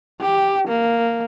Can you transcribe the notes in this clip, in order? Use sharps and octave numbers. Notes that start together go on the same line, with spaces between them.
G4
A#3